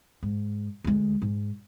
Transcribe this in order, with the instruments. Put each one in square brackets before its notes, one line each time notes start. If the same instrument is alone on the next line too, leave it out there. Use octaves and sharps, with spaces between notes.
[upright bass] G#2
D2 G#3
G#2